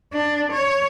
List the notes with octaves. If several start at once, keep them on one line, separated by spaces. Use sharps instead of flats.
D4
C#5